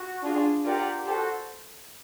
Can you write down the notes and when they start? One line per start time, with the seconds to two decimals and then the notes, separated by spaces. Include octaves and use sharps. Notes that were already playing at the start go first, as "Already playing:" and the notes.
Already playing: F#4
0.23 D4 F4 G#4
0.64 F4 G4 A#4 D5 F#5
1.04 G4 A4 C5
1.14 F#4